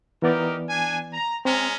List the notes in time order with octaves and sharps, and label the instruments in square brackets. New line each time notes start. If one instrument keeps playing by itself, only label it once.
[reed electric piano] E3 B3 D5 [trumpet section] D#4 G4 A#4
[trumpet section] D4 G#5
A#5
[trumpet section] G#3 C#4 A#5 [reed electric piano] C4